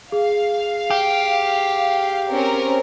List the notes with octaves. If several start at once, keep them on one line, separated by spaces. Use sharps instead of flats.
G#4 F5
G4
C4 C#4 A#4